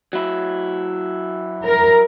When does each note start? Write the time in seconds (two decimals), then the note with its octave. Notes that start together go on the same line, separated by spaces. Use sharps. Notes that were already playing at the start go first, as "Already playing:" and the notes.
0.13 F#3 E4
1.66 A#4